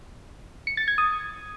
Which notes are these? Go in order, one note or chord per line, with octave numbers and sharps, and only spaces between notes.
C#7
A6
G#6
D#6